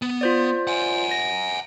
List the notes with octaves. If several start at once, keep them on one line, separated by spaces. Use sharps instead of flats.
B3
F4 C5 D5
F#5 G#5
A#6